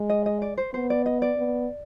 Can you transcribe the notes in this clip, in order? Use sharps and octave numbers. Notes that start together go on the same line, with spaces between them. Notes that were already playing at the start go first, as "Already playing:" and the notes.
Already playing: G#3
D#5
D#5
D5
C5
B3 C5
D5
D#5
D5
B3